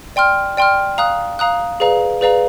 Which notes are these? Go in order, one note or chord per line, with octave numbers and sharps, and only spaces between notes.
D5 G5 C6 F6
D5 G5 C6 F6
F5 A#5 D#6 F#6
F5 A#5 D#6 F#6
G#4 B4 D5 F5 A#5
G#4 B4 D5 F5 A#5